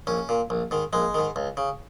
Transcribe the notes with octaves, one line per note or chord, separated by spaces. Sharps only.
A#1 C#4
A#2
A#1
G#2 D#3
A#1 G#3
G#2 D#3
C#2
C#3